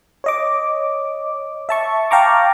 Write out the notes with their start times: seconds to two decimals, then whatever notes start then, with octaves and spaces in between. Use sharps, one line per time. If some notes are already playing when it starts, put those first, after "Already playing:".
0.24 C#5 D#5 D6
1.69 E5 A5 C#6
2.11 F5 G5 A5 A#5 C#6 D6